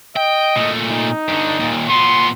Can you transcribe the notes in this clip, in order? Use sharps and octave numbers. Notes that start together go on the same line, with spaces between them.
D#5 G5
A#2 A3
D#4
G2 D3
D#2 A#2
A#2 B3 C6